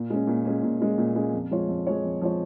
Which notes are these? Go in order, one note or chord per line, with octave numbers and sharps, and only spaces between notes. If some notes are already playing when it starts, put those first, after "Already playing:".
Already playing: A#2
G#3 C#4
A#2
G#3 C#4
A#2
G#3 C#4
A#2
G#3 C#4
F2
F3 G#3 F4 C#5
F2
F3 G#3 F4 C#5
F2
F3 G#3 F4 C#5